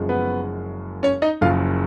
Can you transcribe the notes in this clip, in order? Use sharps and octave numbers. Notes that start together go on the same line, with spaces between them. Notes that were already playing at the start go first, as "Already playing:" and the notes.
Already playing: F#1 F#2 F3 G#3
B3 B4
C#4 C#5
D#4 D#5
F#1 F#2 C#3 F3 F4 F5